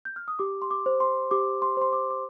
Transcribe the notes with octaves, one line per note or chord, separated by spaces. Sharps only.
G6
F6
D#6
G4 D6
C6
D6
C5
C6
G4 D6
C6
C5 C6
D6
D6